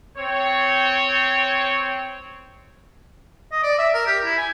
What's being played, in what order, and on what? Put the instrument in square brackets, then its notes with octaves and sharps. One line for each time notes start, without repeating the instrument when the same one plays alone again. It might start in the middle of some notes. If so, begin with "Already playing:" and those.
[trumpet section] C4 C#5
[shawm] D#5
D5
E5
A#4
G4
E4
G#5